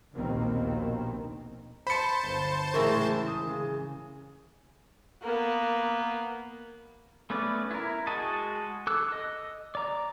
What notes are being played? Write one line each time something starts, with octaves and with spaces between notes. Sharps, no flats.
A#1 D#2 B2 D#3 A#3 C4
C5 A5 B5 C#7
G1
A2 C#3 E3 G#3 A#4 C#6
D#6
C#3
A#3 B3
A3 B3 C#4 B4 D5
E4 A#4
G#3 F#4 D#5 A5
A4 D6 E6 F#6
D#5
D5 A#5